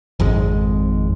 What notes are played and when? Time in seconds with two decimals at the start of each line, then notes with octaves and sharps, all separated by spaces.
0.20 G#1 F2 G#2 G#3